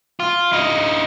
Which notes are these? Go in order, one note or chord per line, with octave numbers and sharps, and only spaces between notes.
F4
D#4 E4